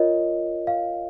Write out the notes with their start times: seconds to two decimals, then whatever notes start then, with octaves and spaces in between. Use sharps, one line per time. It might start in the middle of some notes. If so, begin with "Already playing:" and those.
Already playing: F4 A#4 C#5 D#5
0.67 F5